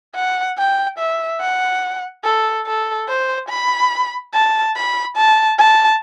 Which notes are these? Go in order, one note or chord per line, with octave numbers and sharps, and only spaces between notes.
F#5
G5
E5
F#5
A4
A4
C5
B5
A5
B5
A5
A5